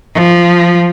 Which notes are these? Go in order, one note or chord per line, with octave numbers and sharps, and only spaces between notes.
F3